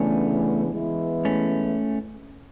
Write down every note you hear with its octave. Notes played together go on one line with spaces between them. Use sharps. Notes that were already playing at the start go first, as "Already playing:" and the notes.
Already playing: C#3 E3 A3 B3 C#4 D4
E3 G#3 B3 E4
A3 C#4